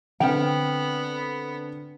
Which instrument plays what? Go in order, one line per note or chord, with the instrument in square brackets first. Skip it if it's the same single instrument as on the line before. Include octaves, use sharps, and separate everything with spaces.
[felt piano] D3 C4 F6 [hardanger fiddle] B3 [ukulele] G5